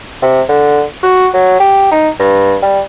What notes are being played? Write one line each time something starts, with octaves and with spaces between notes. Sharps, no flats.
C3
D3
F#4
F#3
G4
D#4
G2
G3